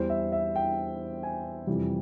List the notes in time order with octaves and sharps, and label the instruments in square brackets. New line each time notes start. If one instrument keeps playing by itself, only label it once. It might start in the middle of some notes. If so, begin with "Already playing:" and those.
Already playing: [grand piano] E2 E3 G3 C5
E5
E5
G5
G#5
F2 C3 E3 G3